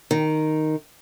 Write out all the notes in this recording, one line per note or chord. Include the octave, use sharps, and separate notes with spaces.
D#3